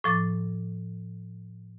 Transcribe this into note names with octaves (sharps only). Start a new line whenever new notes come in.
A2 F3 D6 A6